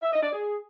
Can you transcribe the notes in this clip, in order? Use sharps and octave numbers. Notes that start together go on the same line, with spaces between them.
E5
D#5
D5
G#4